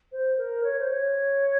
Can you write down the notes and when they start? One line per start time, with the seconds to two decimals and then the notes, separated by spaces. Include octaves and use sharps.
0.12 C5
0.38 A#4
0.64 C#5
0.79 C5
0.90 C#5